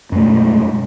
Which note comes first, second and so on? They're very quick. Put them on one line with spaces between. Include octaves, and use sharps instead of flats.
F#2 A3 B2 G#3